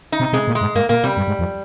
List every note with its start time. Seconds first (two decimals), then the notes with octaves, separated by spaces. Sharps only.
0.12 D#4
0.20 C3
0.33 C3 G#3
0.48 A#2
0.55 G#3
0.61 G#2
0.76 G#2 A#3
0.89 A#2 A#3
1.04 C3 G3
1.17 G2
1.28 G#2
1.39 F2